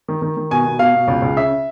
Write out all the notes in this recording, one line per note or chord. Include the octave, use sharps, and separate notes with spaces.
D#3
D#3
D#3
B2 G#5
B2
B2 F5
B2
C#2
C#2
C#3 E5